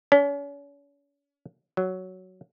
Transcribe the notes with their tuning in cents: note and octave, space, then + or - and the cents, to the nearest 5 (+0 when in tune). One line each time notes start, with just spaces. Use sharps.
C#4 +40
F#3 +5